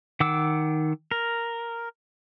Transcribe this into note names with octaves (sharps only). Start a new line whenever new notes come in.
D#3 F#5 D6 E6
A#4